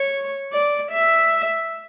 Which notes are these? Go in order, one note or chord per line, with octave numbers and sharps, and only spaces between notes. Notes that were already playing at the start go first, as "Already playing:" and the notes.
Already playing: C#5
D5
E5